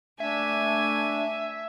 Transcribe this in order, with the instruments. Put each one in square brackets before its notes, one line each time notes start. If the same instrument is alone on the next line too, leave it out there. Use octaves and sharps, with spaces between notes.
[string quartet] A3 G#5 [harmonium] D4 [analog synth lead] E5